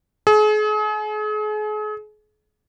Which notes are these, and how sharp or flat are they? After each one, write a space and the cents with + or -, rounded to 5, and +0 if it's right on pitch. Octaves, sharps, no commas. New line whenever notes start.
G#4 +40